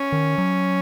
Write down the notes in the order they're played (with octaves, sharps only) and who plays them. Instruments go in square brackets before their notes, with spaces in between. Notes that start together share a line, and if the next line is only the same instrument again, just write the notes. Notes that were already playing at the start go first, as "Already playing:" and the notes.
Already playing: [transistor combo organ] C#4
[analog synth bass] D#3
F#3